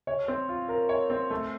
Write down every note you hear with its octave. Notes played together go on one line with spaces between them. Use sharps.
C#5
C4
F4
A#4
C#5
C4
A3